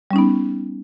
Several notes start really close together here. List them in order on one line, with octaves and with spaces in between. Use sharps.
G3 C#4 D#4 B3